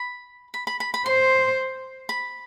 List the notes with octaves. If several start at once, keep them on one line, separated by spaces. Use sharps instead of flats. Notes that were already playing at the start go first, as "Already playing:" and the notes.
Already playing: B5
B5
B5
B5
B5
C5 C6
B5